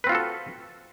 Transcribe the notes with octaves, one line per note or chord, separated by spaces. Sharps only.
C4 F4 F#4 A4 B4